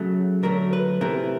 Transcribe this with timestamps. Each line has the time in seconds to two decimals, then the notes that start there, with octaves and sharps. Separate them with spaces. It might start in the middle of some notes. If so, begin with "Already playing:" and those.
Already playing: C#3 F#3 A3
0.43 D3 F#3 A3 A#4
0.73 B4
1.01 C3 E3 A3 A#4